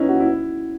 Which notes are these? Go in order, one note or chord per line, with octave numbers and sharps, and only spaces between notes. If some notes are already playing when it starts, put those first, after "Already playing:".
Already playing: B3 C#4 D#4 E4
F#4
E4